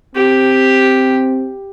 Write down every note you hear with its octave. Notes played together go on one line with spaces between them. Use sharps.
C4 G4